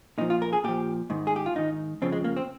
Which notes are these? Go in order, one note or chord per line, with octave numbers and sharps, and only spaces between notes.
A#2 F3 D#4
F4
A#4
G#4
A#2 F3 G4
G#2 D#3
G#4
G4
F4
G#2 D#3 D#4
F2 C#3 F3 C4
G#3
A#3
C4